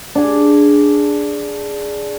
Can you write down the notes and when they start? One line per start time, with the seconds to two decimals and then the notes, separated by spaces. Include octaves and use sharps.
0.15 D4 G#4